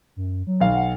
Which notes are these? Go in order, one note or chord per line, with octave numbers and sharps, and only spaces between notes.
F#2
F#3
B1 F5
F#5